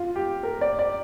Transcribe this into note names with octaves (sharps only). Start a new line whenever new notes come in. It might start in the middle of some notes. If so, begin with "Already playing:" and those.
Already playing: F4
G4
A#4
D5
D5